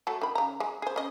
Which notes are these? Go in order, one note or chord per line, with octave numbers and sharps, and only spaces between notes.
F#3 A3 A4
D#3 B5
C#3 A#5
G#3
G#4 C5
C#4 D#5